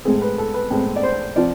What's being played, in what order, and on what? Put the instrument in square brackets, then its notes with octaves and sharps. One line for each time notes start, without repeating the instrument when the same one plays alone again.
[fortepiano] A2 G#3 C4 G#4
B4
A4
B4
A2 G#3 C4
D5
C5
C3 F3 D5